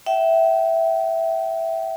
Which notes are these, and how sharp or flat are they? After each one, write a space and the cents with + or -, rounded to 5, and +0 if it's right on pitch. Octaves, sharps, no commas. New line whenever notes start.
E5 +0 G5 -35